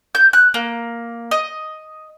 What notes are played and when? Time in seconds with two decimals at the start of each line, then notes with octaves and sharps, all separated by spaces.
0.15 G6
0.33 F#6
0.54 A#3
1.31 D#5